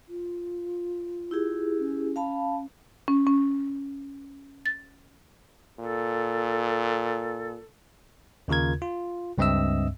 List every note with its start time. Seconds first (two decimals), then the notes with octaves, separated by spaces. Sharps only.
0.08 F4
1.31 E4 G4 G#4
1.79 C#4
2.16 F5 A5 B5
3.08 C#4
3.27 C#4
4.66 A6
5.79 A#2 A4
8.48 D#2 C#3 F4 A#4 G#6
8.82 F4
9.38 C#2 G2 C4 D#5 E5 E6